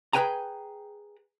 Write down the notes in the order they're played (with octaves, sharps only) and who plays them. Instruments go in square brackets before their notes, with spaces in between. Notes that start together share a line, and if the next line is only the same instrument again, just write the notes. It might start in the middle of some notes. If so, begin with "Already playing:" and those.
[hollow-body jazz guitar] G#4 A#4 B4 G5 G#5 A#5